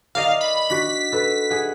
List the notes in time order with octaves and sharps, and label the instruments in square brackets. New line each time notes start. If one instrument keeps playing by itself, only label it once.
[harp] A#4 D5 D#5 [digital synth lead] F5
[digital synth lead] B5
[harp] D4 F#4 [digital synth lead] B6
[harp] A4 B4
G#4 F#5